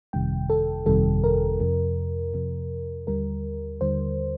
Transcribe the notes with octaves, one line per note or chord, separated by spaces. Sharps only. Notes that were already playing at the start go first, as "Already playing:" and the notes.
G1 F2 C3 D#3 G3 G5
A4
G1 F2 C3 D#3 G3 A4
A#4
F2 C3 F3
F2 C3 F3
D#2 D3 G3 A#4
D#2 D3 G3 C5